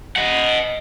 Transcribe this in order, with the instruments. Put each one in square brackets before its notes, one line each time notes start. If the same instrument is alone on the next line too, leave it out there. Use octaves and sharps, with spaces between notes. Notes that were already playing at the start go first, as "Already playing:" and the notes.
[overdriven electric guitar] D#5 F#5